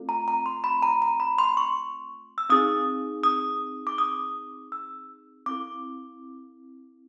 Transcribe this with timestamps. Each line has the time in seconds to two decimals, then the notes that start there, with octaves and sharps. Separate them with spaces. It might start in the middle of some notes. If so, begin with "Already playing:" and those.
Already playing: A3 C4 F4 A4
0.09 A#5
0.28 A#5
0.46 C6
0.64 B5
0.82 A#5
1.02 A#5
1.20 B5
1.38 C6
1.57 C#6
2.38 E6
2.50 C4 D#4 G#4 D#6
3.23 D#6
3.87 D6
3.98 D#6
4.72 E6
5.46 C4 E4 A4 D6